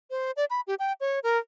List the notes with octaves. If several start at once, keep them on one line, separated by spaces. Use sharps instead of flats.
C5
D5
B5
G4
G5
C#5
A#4